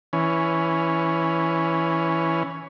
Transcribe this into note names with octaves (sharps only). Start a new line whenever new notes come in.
E3 C#4